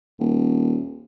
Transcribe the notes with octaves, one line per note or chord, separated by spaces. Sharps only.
D#1